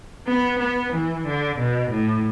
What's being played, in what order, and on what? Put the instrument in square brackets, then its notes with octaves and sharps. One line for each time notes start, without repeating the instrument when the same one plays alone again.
[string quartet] B3
B3
E3
D3
B2
A2